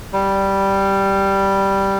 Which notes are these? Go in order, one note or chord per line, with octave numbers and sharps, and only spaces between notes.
G3